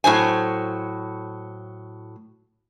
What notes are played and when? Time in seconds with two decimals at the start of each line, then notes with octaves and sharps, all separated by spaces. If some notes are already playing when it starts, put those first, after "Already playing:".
0.04 A2 F#3 C5 G#5